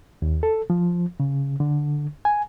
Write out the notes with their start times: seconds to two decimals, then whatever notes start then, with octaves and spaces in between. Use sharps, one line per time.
0.22 D#2
0.43 A4
0.70 F3
1.20 C#3
1.60 D3
2.25 G#5